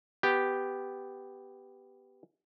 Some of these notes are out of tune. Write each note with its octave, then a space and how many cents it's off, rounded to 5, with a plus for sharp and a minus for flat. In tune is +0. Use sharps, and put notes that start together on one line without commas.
B3 +10 G4 +0